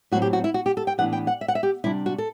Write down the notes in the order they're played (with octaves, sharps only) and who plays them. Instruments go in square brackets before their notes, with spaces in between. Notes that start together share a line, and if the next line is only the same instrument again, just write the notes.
[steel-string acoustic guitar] A2 F#3 C4 F#4
G4
F#4
E4
F#4
G4
A4
G5
A2 E3 B3 D4 F#5
G5
F#5
E5
F#5
E5
G4
C3 G3 D4 E4
F#4
A4